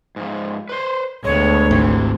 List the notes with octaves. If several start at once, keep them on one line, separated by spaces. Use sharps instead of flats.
G#2 F3
B4 C5
D2 G#3 B3 C#5
G#1 C3 E3